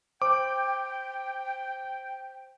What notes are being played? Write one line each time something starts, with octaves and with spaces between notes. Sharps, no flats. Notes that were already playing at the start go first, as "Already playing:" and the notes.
C5 G5 D6